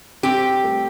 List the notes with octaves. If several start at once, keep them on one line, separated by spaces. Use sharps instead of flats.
C4 G4
A3